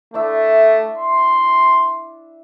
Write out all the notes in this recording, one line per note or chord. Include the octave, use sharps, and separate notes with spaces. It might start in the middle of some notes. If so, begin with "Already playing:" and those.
A3 D4 E4 E5
C6